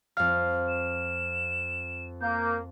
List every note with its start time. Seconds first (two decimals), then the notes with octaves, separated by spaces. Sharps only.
0.17 F2 F5 F6
0.68 E7
2.21 A#3 G6